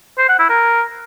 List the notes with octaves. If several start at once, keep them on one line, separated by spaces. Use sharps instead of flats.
C5
F#5
E4
A#4